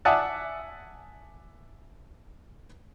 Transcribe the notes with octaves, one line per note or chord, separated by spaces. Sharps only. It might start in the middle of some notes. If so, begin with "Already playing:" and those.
D5 E5 F#5 G#5 A5 D#6